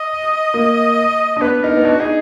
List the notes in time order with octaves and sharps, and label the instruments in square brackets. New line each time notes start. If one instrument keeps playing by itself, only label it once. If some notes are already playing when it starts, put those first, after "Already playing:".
Already playing: [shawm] D#5
[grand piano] A#3
D4
[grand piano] B3 [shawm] B4
[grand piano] D#4 [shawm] A#4
[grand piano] B3
[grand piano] D4 [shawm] F#4
[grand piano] D#4 [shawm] G#4